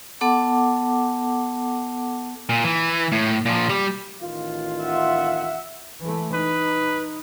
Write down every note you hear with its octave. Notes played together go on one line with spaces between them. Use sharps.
B3 A4 F#5 A5 D6
A#2
E3
A2
A#2 F3
G3
A1 D#3 F4
E5 F#5
E3 A3
D#4 B4